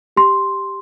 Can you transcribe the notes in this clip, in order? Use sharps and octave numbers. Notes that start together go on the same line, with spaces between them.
G4 C6